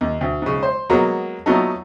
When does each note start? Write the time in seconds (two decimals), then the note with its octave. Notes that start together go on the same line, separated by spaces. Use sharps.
0.01 D#2
0.21 D2
0.42 G#2 C#3
0.63 C5
0.90 F#3 G#3 A#3 B3
1.46 A#2 F#3 A3 B3 D#4 A4